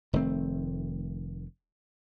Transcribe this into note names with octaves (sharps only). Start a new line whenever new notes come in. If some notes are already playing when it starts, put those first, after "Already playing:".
F1 D#3 A3 C4